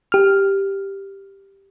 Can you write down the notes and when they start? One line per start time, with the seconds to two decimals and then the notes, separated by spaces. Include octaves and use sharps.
0.12 G4 F6